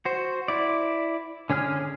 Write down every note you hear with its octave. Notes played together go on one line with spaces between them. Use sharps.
F#4 C5
E4 D5
D3 C#4 G#4 F6